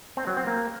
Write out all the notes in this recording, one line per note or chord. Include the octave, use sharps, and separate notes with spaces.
C4
F#3
C4
A#3